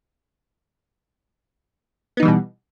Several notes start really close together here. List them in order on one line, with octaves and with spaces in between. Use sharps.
B3 D#4 E3 G3 B2